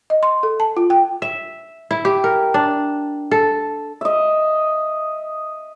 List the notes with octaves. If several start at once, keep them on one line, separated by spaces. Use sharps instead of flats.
D#5
C6
A4
A5
F4
G5
E5
E4
G4
A#4
D4
A4
D#5 E5